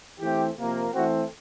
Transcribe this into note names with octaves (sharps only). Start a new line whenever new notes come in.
E3 A3 C4 G4
C3 F3 A#3
E3 A3 C4 F#4